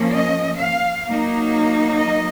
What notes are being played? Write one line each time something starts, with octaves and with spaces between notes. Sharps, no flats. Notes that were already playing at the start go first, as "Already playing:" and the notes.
Already playing: F3 A#3 C#4
D#5
F5
F#3 A#3 D#4
D#5